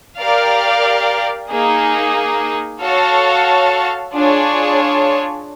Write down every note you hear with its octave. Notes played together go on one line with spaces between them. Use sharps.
G4 A#4 D5 F5
A#3 D#4 G#4
F#4 A4 C#5 F5 A5
D4 F4 G#4 C#5